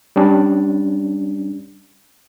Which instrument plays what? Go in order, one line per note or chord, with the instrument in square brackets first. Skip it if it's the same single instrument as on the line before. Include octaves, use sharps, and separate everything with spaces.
[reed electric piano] G3 C#4 D4